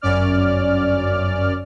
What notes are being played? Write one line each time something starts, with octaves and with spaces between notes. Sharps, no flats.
G1 F#2 C#4 D5 F6